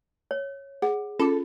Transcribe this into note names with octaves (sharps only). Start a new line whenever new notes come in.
C#5
G#4 F#5
C#4 F4 A4 D6